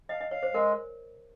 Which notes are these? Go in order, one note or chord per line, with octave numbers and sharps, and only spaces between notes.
D#5 F5
D#5
C#5 F5
C5
G#3 A#4